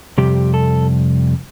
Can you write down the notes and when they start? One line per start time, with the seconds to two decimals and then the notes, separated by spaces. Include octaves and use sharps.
0.18 F2 C3 G3 G4
0.54 A4